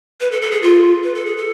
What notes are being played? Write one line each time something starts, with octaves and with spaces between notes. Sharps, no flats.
B4
A4
A4
G#4
F4
B4
A4
G#4
A4